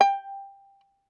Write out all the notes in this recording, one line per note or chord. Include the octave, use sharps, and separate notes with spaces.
G5